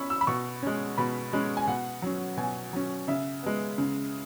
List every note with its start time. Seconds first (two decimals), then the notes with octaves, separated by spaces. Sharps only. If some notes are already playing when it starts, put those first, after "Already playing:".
Already playing: C#4 B5 C#6 E6
0.10 E6
0.21 B5
0.27 B2 C#6
0.63 G#3 C#4
0.98 B2 B5
1.33 G#3 C#4
1.57 G#5
1.67 B2 F#5
2.02 F#3 C#4
2.37 B2 G#5
2.73 F#3 C#4
3.08 C#3 E5
3.43 G#3 B3
3.78 C#3